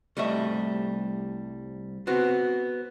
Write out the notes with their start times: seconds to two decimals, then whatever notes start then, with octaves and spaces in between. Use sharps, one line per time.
0.17 C2 G3 A3 D#5 E5
2.07 B3 C4 F#4